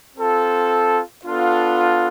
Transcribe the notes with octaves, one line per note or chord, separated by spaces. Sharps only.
C4 F4 A4
B3 D4 F4 A4